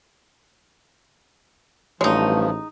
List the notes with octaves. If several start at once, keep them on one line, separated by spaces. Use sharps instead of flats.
A1 G2 F3 G#3 A3 D#4 F#4 C#5